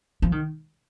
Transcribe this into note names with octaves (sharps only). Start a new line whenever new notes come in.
F3
D#3